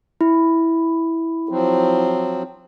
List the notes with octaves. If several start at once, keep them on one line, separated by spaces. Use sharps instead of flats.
E4
F3 F#3 C4